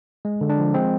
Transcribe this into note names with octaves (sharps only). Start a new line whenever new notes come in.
G#3
D3
D4
F3
G#3 C4